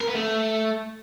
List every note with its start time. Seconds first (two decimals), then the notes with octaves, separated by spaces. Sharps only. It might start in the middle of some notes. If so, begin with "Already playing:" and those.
0.01 A#4
0.08 B3
0.15 A3